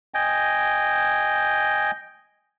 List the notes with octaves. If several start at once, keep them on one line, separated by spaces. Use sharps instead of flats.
D#5 G5 G#5